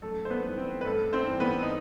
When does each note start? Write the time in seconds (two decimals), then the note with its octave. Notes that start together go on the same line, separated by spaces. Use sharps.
0.02 F#2 A3 A4
0.25 C5
0.30 B3 B4
0.43 E3 G3
0.58 C4
0.81 B4
0.85 G2 A3 A4
1.13 C4 C5
1.26 E3 G3
1.40 B3 B4
1.63 D#4